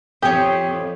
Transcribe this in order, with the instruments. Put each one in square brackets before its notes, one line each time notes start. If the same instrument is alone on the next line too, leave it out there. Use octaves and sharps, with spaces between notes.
[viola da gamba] F2 [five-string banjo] G4 [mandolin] C#5 D#6